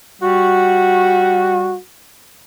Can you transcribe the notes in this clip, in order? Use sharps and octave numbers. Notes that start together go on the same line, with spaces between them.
G3 F#4